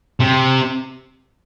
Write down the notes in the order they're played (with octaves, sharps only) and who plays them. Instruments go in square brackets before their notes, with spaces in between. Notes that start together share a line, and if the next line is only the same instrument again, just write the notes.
[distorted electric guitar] C3